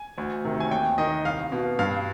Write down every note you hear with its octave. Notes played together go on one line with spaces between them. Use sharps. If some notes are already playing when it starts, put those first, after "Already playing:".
Already playing: G#5
D2
C3 D#3
G#5
D#2 G5
D#3 D#5
C2 F5
B2
G2 F5